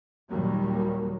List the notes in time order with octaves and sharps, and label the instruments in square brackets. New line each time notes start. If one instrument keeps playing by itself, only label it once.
[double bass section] D#2 A#2 D#3 F#3 G3 A#3